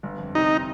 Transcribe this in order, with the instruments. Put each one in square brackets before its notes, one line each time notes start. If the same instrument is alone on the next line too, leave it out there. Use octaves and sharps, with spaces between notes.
[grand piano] G1
F2
[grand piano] C3 [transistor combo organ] D#4